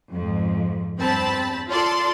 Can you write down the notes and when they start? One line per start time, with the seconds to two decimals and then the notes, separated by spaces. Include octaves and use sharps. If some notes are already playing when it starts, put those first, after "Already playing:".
0.12 F2 G#2
0.97 E2 G2 C4 A5 B5
1.68 F4 A4 D5 C6